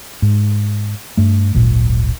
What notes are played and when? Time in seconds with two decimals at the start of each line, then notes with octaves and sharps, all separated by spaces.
0.22 G#2
1.17 G2 A3
1.54 D1 G#1 A#2